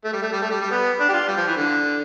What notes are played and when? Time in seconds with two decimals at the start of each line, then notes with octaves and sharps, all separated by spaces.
0.04 A3
0.13 G3
0.22 A3
0.33 G3
0.42 A3
0.51 G3
0.61 G3
0.71 B3
1.00 D4
1.09 G4
1.13 F4
1.28 G3
1.37 F3
1.47 E3
1.57 D3